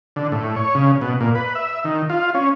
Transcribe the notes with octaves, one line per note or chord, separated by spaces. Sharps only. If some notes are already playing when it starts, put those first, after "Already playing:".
D3
A2
C#5
C#3
B2
A#2
B4
E5
D#3
F4
C#4